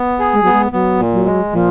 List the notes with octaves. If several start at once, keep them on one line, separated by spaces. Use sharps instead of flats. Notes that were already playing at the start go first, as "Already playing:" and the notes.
Already playing: B3
G#4
G#3
F#3 B3
G#3
F#3 B3
A#2
F#3
G#3
A#2 F3